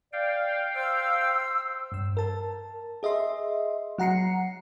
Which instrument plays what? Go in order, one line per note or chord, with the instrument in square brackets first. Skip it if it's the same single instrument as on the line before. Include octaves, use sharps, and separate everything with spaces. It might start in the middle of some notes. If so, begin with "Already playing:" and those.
[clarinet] D5 [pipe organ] F5 G5
[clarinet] C5 [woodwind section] E6
[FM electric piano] G2 E6
A#4 A5
G#4 D#5 E5 C6
F#3 F#5 A#5 C7 C#7